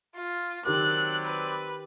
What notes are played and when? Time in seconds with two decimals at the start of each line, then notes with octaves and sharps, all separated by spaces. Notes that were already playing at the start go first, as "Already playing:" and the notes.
0.15 F4
0.65 D#3 F#3 C4 G4 A#4 D5 F#6
1.25 B4